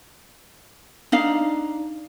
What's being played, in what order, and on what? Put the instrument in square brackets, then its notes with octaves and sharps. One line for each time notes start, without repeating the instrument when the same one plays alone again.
[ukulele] D4 D#4 F5